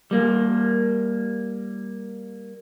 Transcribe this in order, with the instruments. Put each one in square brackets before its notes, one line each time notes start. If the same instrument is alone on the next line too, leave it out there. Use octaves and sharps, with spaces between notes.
[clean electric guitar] G3 A#3